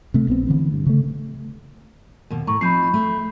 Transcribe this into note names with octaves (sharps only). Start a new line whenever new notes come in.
C3 A3
A#1 B3 C4
D3 E3 C4
G2
C#3 A3
D#2 B2
A2 A#5 C#6
F3 C4 D#4 B5 G6 C7
A3